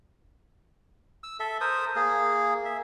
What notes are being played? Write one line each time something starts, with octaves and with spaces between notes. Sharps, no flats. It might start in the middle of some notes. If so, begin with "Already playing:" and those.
E6
A4 E5
A#4 C5 D#6
A#3 G#4
E5